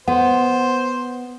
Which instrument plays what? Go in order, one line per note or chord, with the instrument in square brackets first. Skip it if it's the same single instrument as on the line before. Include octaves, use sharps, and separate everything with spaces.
[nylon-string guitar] B3 [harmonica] C5 [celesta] F#5